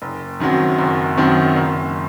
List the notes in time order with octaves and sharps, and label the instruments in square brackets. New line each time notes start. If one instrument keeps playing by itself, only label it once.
[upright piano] F#1
F#2 D#3 F#3 C4
F#1
F#2 D#3 F#3 C4
F#1